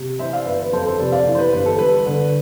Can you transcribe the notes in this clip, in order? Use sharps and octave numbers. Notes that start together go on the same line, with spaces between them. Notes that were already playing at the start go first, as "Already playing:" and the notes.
Already playing: C3
E3 C5 E5
D5 F5
G1 B4
B4
F2 A4 C5
A4 C5
C3 B4 D5
D5 F5
E3
C5
B4
G1 B4
A4
G2 B4
D3